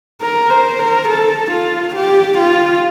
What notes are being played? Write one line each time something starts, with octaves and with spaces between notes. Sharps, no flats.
A#4
C5
A#4
A4
F4
G4
F4